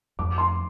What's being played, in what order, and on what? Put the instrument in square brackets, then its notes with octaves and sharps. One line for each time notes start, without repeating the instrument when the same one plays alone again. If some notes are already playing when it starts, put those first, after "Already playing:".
[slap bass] F2 [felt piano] D6
[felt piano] C6